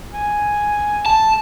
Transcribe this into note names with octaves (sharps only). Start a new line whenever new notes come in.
G#5
A5